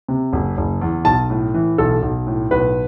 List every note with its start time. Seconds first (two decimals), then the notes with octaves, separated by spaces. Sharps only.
0.08 C3
0.33 F#1
0.57 F#1
0.81 E2
1.05 B1 A5
1.30 A2
1.54 E3
1.78 B1 A4
2.02 B1
2.27 A2
2.51 B1 B4